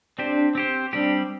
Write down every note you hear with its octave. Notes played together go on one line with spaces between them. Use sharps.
C4 D4 G4 C5
C4 G4 C5
G3 C4 D4 G4